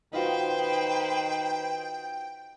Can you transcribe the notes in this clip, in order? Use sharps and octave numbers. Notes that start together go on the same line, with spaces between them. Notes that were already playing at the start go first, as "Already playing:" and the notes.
D#3 D#4 F4 F#4 B4 C5 G5